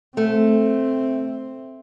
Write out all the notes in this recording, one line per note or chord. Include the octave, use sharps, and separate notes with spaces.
A3 C4